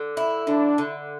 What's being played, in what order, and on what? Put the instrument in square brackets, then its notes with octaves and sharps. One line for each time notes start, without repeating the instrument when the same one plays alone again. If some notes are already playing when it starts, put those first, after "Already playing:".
Already playing: [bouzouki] D3
E4
[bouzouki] D3 [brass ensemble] D4
[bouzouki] D3